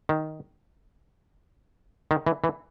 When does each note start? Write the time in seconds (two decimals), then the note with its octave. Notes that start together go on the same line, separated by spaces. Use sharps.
0.09 D#3
2.11 D#3
2.26 E3
2.44 E3